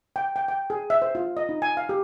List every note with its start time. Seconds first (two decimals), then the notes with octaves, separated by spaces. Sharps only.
0.16 G5
0.36 G5
0.48 G5
0.70 G#4
0.90 E5
1.02 C5
1.15 F4
1.37 D#5
1.49 D#4
1.62 G#5
1.77 F5
1.89 G4